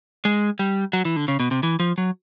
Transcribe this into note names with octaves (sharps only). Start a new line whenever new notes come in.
G#3
G3
F#3
E3
D3
C#3
B2
C3
E3
F3
F#3